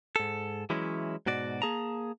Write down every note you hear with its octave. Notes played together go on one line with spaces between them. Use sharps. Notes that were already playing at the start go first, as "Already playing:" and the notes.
G#2 A4
E3 F#3 G#3 C#4 E4
G#2 B2 F#4 D5
A#3 G#4 A5 A#5